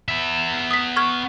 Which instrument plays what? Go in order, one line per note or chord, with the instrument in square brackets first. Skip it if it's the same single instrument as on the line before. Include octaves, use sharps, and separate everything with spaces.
[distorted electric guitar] B3 E5
[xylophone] D#6 B6
C#6 F6 G#6